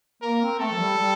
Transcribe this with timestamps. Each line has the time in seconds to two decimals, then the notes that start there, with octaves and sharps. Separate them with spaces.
0.22 A#3 A#4
0.41 C4
0.60 A3 A4
0.71 F3
0.78 G3
0.97 G3